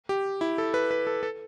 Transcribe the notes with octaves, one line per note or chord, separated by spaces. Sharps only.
G4
E4
A4
B4
B4
A4
A4